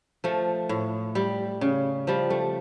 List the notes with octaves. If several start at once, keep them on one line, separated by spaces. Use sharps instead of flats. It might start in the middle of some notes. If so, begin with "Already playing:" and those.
F3 A3
A2
G3
C#3
F3 G3
A3